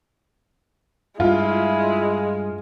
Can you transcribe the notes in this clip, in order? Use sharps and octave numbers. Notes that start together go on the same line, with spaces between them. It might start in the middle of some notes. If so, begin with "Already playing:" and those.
G2 G#3 E4 F4